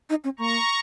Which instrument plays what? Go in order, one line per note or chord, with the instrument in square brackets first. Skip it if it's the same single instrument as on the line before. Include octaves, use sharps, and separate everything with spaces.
[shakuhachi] D#4
C#4
[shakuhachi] A#3 [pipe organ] A#5 C#6